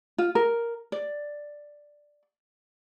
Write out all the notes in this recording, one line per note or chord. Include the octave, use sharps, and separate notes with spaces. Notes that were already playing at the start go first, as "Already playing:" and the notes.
F4
A#4
D5